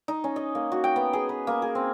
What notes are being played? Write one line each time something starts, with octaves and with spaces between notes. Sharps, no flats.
D#4
C#4
D#5
A#3
F#4
G5
B3
G#4
B4
A#3
G#4
C4